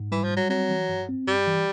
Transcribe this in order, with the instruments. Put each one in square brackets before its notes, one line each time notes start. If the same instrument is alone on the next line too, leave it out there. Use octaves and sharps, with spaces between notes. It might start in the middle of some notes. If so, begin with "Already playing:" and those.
Already playing: [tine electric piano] G#2
[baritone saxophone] E3 [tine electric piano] G3
[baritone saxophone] F3
[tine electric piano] G3
[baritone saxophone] F#3
[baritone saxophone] F#3 [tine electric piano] C4
[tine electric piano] E3
G2
C4
[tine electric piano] G2 [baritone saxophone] G3
[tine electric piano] E3